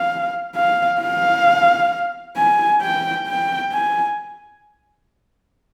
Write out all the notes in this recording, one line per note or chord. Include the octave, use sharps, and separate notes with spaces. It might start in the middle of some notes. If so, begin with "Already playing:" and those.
Already playing: F5
F5
F5
G#5
G5
G5
G#5